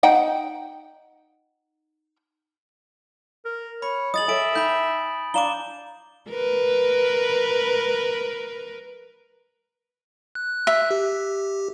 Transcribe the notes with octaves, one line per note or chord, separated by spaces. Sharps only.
D#4 F#5 G5
A#4
C#5 B5
G#4 D#5 D#6 A6 F#7
A4 C#5 E5 G#5 D7
D#4 G5 B5 G6
D4 D5 F5 A#5 D6 E7 G7
A#4 B4
F#6
E5
G4